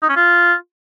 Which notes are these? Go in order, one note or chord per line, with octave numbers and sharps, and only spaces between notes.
D#4
C#4
F4